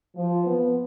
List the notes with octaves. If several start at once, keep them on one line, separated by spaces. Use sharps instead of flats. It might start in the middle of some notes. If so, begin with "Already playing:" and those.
F3
B3